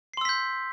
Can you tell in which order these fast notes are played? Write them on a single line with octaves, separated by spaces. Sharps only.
C7 C6 E6 B6 G6